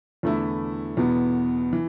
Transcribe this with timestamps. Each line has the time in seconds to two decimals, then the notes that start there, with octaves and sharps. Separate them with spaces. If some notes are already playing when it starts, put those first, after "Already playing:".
0.23 E2 D3 A3 E4
0.97 E2 B2 B3
1.73 E3